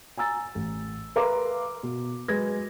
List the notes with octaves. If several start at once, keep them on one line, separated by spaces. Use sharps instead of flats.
G#5 A#5 E6 A6
A1
A#4 B4 F5 A#5 C6 D6
B2
F#3 G#3 B4 G#6 A#6